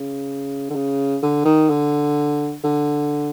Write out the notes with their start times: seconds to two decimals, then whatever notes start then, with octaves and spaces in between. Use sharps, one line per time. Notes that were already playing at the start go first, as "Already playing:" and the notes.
Already playing: C#3
0.70 D3
0.75 C#3
1.23 D3
1.45 D#3
1.70 D3
2.64 D3